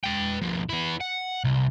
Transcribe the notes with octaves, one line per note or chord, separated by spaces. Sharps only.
B4 G5
B2 F3
B3 E4
F#5
C2